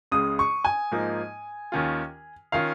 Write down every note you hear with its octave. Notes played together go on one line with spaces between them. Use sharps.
C#2 C#3 G#3 D#6
C#6
G#5
G#2 F3 A#3 D#4
D#2 D#3 C#4 F4
D#3 C#4 F4 F5